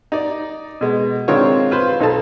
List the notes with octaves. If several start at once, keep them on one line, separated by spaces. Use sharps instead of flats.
D#4 D5
B2 G#3
D#3 G#3 C4 D4 F4 C#5
F4 B4 C5
B1 D#4 A4 A5